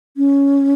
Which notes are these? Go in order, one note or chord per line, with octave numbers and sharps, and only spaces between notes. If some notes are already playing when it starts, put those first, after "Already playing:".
C#4